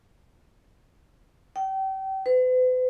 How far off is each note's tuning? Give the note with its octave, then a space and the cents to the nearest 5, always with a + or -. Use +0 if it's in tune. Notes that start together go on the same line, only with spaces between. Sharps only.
G5 -35
B4 +45